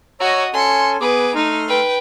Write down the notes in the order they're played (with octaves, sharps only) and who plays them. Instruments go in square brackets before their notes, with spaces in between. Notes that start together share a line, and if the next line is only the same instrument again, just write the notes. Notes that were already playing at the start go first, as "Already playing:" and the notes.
[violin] F#4 D#5 [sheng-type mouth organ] C#5 A#5 E6
[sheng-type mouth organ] C#4 A4 G#5 [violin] C6 C#7
[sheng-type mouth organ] B3 G#4 D6 [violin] B4
[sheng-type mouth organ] A3 C6 F6 [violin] D#4
[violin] B4 G5